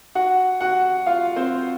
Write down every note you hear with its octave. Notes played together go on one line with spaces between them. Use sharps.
F#4 F#5
F#4 F#5
F4 F5
C4 C5